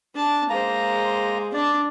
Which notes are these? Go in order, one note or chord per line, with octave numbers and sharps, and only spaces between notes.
D4 A5
G#3 A#3 C5 A#5
D4 D5